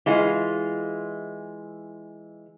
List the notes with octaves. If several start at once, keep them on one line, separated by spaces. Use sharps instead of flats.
E3 G#3 F4